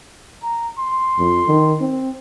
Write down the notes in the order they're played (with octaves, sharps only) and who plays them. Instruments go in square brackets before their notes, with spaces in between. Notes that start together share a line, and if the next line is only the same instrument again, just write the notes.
[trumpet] A#5
C6
[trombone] F2
D#3
C4